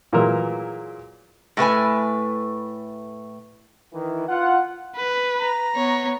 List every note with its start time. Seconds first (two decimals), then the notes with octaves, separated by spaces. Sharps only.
0.13 A#2 E3 F#3 G#3 A#4 E6
1.57 A2 A3 B4 G#5
3.94 D#3 E3 E4
4.28 F4 F#5
4.96 B4
5.39 A#5
5.76 B3 C#5